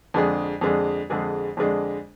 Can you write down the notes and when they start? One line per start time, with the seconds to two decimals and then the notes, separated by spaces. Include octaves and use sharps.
0.14 F2 D3 G#3 D4 G#4
0.61 F2 D3 G#3 D4 G#4
1.10 F2 D3 G#3 D4 G#4
1.57 F2 D3 G#3 D4 G#4